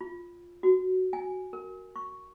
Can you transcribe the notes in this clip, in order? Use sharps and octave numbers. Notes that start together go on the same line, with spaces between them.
F4
F#4
G#5
A#4
C#6